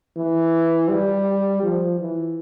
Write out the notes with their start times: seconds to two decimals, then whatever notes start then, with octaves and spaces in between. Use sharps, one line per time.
0.16 E3
0.89 G3
1.62 F3
2.00 E3